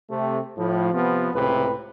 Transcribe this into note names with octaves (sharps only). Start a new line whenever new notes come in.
C3 A3
A2 F3
C3 F3 B3
C#2 A2 C3 B4